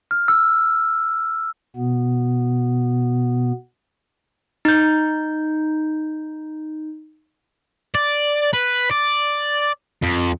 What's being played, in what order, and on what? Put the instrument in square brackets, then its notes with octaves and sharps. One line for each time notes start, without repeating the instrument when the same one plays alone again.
[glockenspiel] F6
E6
[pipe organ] B2 B3
[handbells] D#4 G6
[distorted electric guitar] D5
B4
D5
F2